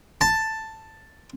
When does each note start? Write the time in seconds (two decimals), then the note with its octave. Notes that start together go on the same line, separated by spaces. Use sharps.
0.21 A5